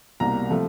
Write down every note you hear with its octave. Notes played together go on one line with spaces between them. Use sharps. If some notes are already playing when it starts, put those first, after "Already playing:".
C2 B2 G3 A#3 A#5
C3 F3 A3